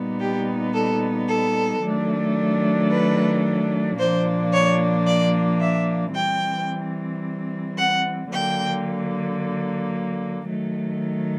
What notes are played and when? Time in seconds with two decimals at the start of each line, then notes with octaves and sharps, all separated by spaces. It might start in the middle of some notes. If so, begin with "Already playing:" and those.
Already playing: A#2 G3 B3 D#4
0.19 G4
0.73 A4
1.27 A4
1.82 D#3 F#3 A3 D4
2.90 B4
3.98 A#2 F3 A#3 D4 C5
4.52 C#5
5.05 D5
5.59 E5
6.13 E3 G3 C4 G5
7.77 F#5
8.30 D3 F#3 A#3 G5
10.46 D#3 F#3 A3